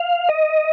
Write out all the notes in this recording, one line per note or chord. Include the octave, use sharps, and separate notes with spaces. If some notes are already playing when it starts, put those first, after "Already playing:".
Already playing: F5
D#5